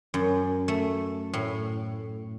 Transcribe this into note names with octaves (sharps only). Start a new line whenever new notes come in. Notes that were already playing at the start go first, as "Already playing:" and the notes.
F#2
A3
A2